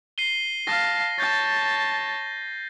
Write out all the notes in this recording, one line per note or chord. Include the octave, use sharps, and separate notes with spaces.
C7 D#7 G7
F5 A5 A#6
C#5 A5 G6 A6